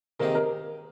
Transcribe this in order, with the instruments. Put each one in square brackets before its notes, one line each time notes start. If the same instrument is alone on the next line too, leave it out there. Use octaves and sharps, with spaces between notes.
[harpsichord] C3 D#3 A#3 D#4 G#4 [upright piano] A#4
[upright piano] A#4